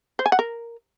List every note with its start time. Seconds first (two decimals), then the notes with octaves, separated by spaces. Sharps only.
0.19 C5
0.26 G#5
0.32 F#5
0.39 A#4